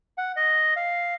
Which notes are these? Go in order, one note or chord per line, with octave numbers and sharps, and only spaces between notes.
F#5
D#5
F5